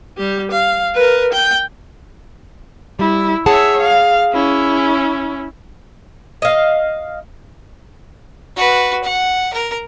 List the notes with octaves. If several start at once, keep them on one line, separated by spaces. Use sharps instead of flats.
G3 G4
F5
A#4 B4
G5
G3 E4
G#4 C#5 E5 F#5 A5
F5
C#4 E4
D#5 F5
F#4 B4
F#5
A#4